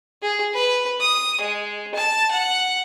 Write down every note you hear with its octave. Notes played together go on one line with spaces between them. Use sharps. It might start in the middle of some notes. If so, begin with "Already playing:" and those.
G#4
B4
D#6
G#3
A5
F#5